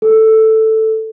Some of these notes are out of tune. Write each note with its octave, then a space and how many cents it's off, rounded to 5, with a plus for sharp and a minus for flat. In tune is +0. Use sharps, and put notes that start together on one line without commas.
A4 +5